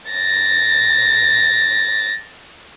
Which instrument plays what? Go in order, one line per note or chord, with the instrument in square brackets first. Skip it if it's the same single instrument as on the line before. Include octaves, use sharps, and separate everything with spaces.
[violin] A6 A#6